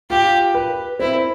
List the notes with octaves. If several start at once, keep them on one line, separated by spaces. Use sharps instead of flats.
F4 G4
B4
C4 E4